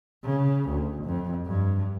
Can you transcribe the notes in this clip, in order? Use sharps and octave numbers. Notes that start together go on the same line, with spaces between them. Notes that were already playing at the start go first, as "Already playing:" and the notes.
C#3
D2
F2
G2